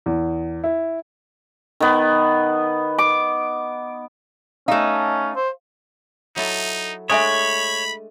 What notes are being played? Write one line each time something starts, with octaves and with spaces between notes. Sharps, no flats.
E2
E4
D#3 B3
D6
A3 C#4 D#4 F5
C5
F#3 D#4 E4 A4
G#3 A3 D4 C#5 E5 G#5 B5 D#6